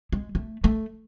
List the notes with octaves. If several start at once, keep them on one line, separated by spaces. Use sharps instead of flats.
G#3
A3
A3